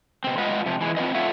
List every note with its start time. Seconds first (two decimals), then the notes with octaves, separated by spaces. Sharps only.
0.24 B2 C4
0.38 G#3 F4 B4 D#5 F#5
0.66 C3 F3
0.81 E3 G#3
0.97 C4 F4 B4 D#5
1.15 F4 A4 C#5 E5 F#5